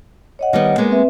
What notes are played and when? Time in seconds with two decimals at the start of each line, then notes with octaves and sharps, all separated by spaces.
0.39 C#5 D#5 F#5
0.53 D#3 G3 B3
0.78 G#3 A#3 B3
0.90 C4 B4 E5